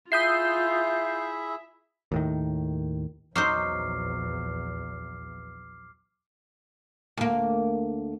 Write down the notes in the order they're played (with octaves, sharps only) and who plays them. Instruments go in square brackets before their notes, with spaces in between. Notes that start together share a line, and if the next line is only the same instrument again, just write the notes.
[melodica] E4 G#4 [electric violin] F4 [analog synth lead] E5 [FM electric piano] D#6 G6 C7
[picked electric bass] D#2 A2 D#3
[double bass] A#1 E2 [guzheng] F#3 D#4 C5 [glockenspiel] D6 F6 C7
[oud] D2 A#3